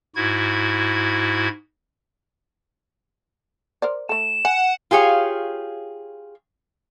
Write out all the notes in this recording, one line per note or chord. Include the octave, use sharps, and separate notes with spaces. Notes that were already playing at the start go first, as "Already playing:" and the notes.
G#2 E4 F#4 G#6
A#4 C5 D5
A3 A4 E7
F#5 G#5
F4 G4 G#4 C#5 F5